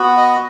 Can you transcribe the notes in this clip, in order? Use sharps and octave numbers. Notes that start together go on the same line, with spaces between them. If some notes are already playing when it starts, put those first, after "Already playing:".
Already playing: B3 F#4
D#5